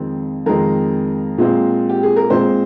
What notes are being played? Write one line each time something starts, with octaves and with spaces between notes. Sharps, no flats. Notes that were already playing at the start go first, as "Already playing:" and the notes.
Already playing: F2 D#3 G#3 C4
F2 D#3 G#3 C4 A#4
A#2 G#3 C4
G4
G#4
A#4
A#2 G#3 C4 C5